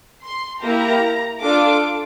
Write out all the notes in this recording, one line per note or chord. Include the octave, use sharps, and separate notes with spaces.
C6
A#3 E4 G4 A#5
D4 F4 A4 D6